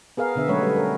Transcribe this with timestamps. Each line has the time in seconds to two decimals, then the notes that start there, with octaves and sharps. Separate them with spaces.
0.17 B3 G#4 A#4 F5
0.35 B2 D3 B3 E5
0.48 F#3 G#3 A3 C#4 B4 C#5
0.61 G3 A3
0.76 A#4